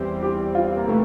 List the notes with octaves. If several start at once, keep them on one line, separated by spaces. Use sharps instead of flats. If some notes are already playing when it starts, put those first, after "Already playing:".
Already playing: E2 E3 G3 C4
G4
F4
A#3
C3 E3 A3